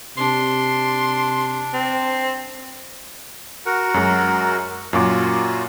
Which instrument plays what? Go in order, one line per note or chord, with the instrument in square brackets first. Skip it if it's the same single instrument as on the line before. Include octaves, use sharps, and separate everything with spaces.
[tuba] C3 [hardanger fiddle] D4 [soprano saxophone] C6
[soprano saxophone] C4
[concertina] F#4 A#4 F#5
[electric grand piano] F#2 G#3
[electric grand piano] F#2 A#2 D6 [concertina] F4 F#4